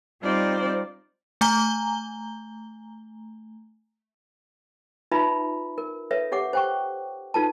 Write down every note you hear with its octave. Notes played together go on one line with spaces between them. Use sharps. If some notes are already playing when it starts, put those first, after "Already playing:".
G3 C4 D#4 F4 C5 D5
A3 G#5 A#5 G7
D#4 F4 B4 E5 A#5 B5
A#4
A4 B4 C#5 E5
G4 C#5 F#5 D6
C5 G5 C#6
D#4 F4 A4 B4 A5